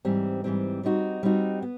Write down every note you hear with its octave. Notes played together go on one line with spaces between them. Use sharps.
G#2 E3 G3 C4
G#2 E3 G3 C4
G3 C4 D#4 F#4
G3 C4 D#4 F#4
B3